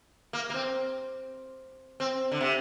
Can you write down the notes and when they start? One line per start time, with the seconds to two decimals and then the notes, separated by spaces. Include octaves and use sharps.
0.33 A#3
0.50 A#3
0.54 C4
2.00 C4
2.32 D3
2.41 C3